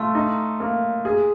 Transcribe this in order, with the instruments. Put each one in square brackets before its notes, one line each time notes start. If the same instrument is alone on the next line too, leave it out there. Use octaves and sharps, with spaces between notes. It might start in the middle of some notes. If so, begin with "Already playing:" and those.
Already playing: [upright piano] A3 [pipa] F4
[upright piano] D#4
A#3
G#4